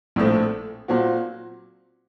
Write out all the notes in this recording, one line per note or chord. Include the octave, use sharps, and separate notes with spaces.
A#1 A2 A3 C4
A#2 F#3 C4 F#4